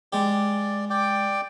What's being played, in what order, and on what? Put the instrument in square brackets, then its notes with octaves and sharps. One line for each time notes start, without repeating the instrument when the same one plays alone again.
[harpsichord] G#3 G4 [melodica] D5
[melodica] D5 G5 D6